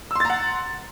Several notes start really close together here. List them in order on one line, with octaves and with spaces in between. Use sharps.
E6 C6 A6 A#5 F#5